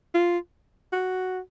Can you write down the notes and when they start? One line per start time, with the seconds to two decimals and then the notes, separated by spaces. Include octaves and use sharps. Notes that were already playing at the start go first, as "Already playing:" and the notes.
0.14 F4
0.93 F#4